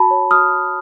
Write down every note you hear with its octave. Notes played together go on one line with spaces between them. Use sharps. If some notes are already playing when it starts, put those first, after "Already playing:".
Already playing: F#4 A5 B5
C#5
F#4 D#6 F6